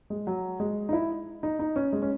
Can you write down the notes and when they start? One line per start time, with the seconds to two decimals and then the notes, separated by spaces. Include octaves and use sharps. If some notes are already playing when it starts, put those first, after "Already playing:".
0.10 G#3
0.27 F#3
0.60 G#3
0.89 D#4
0.93 E4
1.43 D#4
1.59 D#4
1.76 C#4
1.93 G#3
2.02 C#4